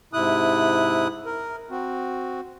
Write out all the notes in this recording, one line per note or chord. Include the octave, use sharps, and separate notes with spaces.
G#2 C3 E4 D#6 F#6
A#4
C4 F#4